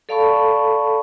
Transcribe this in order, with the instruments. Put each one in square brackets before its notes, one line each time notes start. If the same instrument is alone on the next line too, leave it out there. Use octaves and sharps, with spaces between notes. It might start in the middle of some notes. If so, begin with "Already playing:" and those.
[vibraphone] A4 D5 F5 A5 B5 C#6